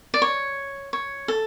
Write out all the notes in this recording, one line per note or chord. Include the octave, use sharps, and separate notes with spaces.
D5
C#5
C#5
A4